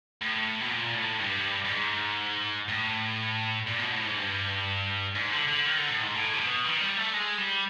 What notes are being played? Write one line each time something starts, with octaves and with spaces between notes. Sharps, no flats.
A2
B2
A#2
A2
G2
G2
G#2
A2
A#2
B2
A2
G#2
G2
G#2
D3
D3
D#3
D3
A2
G#2
A2
C3
B2
D#3
G3
A3
G#3
G3